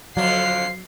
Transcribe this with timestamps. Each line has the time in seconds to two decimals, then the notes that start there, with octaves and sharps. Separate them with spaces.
0.17 F2 D3 F#3 D4 C5 F5 C7